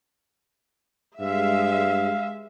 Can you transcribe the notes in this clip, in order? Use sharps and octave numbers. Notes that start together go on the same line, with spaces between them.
G2 G#3 E5 F5